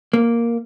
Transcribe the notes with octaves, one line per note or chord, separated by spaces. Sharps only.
A#3